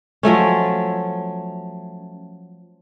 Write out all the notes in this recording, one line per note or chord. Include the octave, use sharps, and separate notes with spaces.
F3 F#3 A3 C#4